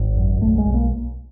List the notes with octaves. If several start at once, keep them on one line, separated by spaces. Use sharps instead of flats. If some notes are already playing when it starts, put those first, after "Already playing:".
Already playing: G#1
F#2
B1 A3
G#3
B1
A#3